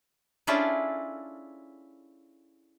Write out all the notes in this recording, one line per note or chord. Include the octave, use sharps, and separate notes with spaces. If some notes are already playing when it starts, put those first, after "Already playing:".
C#4 D4 E4 F4 G#4 A4